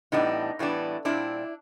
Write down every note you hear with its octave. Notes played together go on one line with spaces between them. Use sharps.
A2 E3 G3 B3 D4 D#4
A2 E3 G3 B3 D4
A#2 G3 C4 D4 E4